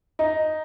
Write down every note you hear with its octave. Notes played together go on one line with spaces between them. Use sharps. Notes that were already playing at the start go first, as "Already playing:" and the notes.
D#4